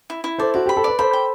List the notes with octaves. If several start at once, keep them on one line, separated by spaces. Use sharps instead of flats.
E4
E4
A4 C5 D5
F#4 D5
G4 B5
A4
B4 D5
A4 C5 B5
G5